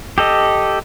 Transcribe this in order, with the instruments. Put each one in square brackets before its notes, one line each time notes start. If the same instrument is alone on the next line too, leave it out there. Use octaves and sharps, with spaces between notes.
[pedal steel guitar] G4 A4 D#5